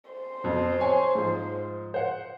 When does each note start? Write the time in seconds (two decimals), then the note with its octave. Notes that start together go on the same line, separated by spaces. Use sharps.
0.10 C5
0.44 F2 B2
0.80 C#5 G#5
1.15 G#2 F3
1.94 C5 F#5